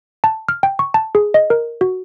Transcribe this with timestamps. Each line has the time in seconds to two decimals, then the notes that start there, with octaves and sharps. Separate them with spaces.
0.24 A5
0.49 F6
0.63 G5
0.79 C#6
0.94 A5
1.15 G#4
1.34 D#5
1.50 A#4
1.81 F#4